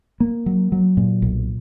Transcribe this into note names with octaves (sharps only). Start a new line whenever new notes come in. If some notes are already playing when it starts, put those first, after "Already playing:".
A#3
F#3
F#3
A#2
B1